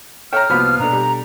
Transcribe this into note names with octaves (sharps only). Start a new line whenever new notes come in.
A4 C#5 E5 G5 A#5 F6
C2 F3 A#3 B3 F#4 B5
B2 D4 A4 A#5
G3